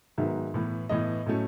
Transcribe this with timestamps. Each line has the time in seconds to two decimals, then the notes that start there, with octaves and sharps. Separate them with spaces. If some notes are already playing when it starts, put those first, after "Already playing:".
0.18 G#2 D#3 F#3 B3 E5
0.54 A2 E3 B3
0.89 A2 E3 B3 D#5
1.26 A2 F#3 A3 C#4